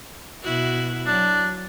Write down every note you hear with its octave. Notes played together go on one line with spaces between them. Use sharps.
B2 E4 F#4
F#3 D4